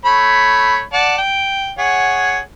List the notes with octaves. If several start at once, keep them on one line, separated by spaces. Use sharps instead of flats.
A3 C#5 B5
D5 F#5 A5
G5
G#4 C#5 F#5